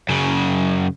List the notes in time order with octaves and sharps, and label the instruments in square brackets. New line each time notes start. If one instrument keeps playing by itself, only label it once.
[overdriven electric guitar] F#2 C#3